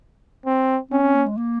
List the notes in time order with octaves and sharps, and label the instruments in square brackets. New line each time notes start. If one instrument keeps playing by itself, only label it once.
[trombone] C4
[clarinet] C4 [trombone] C#4
[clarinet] C4
A#3
G#3
A#3